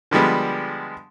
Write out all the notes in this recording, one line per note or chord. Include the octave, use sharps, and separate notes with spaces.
D3 F3 G3 G#3 B3